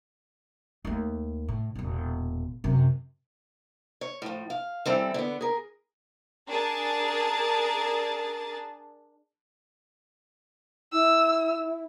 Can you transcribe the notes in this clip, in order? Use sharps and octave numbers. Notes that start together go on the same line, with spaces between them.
D#2 A3
A2
E1 A#2
F#2 C3
C#5
A2 F3
F5
E3 G3 C4 A4
D3 B3
G#4 A#4
D4 G#4 A#4 A5 A6
E4 E6